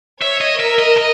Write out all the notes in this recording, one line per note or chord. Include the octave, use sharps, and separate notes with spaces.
C#5 E5
D#5
A#4 E5
D#5
D#5